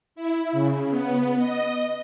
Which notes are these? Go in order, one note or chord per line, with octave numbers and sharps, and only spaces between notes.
E4
C#3
B3
D#5